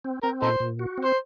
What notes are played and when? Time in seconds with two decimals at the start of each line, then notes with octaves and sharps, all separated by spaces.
0.05 C4
0.23 C4 A#4
0.42 A#2 D#4 A4 C5
0.60 A#2
0.79 F#4
0.98 C4
1.05 C5